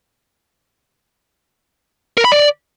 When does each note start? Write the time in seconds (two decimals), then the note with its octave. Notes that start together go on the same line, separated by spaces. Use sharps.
2.17 A#4
2.25 B5
2.32 D5